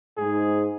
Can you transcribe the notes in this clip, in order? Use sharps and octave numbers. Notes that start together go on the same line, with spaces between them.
G#2 G#4